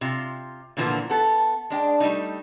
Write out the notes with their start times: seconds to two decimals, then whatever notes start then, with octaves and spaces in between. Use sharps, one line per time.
0.01 C3 F4
0.77 A#2 D3 E3 F3 A#3 B3
1.10 B3 A4
1.70 G#3 D4 G5
2.00 G3 A3 D#4